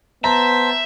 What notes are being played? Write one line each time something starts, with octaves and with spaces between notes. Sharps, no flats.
B3 C5 E5 A5 A#5